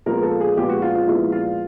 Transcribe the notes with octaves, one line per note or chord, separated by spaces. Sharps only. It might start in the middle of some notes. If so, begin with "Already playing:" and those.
A#2 F3 G#3 B3 A#4
A4
G#4
A#2 F3 G#3 B3 G4
F#4
F4
F4
A#2 F3 G#3 B3 E4
F4